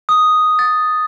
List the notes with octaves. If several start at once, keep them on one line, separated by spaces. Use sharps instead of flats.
D#6
A6